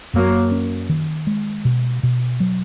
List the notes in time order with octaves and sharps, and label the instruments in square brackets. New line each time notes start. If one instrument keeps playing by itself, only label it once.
[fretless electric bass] F#2 [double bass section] F#3 A#3
[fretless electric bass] C#4
D#3
G#3
B2
B2
F#3